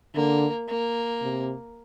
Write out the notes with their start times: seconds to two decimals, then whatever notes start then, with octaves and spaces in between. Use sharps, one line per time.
0.15 D3 A#3
0.68 A#3
1.22 C3